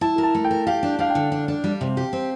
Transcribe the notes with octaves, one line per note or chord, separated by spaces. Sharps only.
E4 A5
A#4
A5
A3
G5
A#4
G4 F5
D4
D4 F5
G5
D3
D4
D4
G3
C3
G4
C4